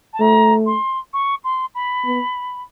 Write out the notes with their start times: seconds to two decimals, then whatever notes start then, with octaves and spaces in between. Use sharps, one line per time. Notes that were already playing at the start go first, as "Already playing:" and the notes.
0.13 A5
0.20 A3 A#5
0.66 C6
1.13 C#6
1.44 C6
1.75 B5
2.06 B3